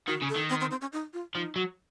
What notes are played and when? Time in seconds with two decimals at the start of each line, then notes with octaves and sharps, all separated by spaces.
0.08 D#3 F#4
0.22 C#3
0.29 A4
0.36 D#3
0.50 C4
0.61 C4
0.71 C4
0.81 C#4
0.93 D#4
1.13 F4
1.34 F3 D#4
1.56 F#3